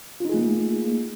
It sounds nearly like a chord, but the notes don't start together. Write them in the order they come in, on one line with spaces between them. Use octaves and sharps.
F4 D#4 G#4 A3 A#3